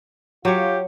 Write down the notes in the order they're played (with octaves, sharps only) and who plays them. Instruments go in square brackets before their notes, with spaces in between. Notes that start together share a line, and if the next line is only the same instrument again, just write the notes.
[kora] F#3 C#5 [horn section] F4 G4